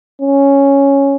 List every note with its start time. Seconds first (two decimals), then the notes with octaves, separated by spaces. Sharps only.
0.22 C#4